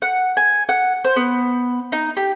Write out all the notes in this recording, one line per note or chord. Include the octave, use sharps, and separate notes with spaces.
F#5
G#5
F#5
C5
B3
D#4
G4